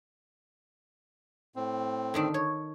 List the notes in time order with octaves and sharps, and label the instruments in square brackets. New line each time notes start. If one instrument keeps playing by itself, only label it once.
[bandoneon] A2 C4
[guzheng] D3 D#3 D4
C#5